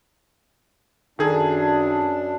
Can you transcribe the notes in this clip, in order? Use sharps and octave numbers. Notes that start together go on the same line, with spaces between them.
F#2 D#3 D4 G#4 A4